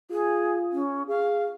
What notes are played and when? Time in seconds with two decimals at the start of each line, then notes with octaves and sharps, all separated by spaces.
0.11 F4 G#4
0.72 C#4
1.09 G#4 F5